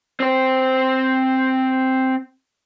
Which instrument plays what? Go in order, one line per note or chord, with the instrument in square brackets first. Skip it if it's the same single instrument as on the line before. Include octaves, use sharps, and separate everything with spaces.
[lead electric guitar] C4 C5